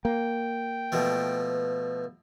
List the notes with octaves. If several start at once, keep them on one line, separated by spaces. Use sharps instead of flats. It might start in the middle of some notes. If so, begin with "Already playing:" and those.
A#3 G5
B2 F3 A3 B4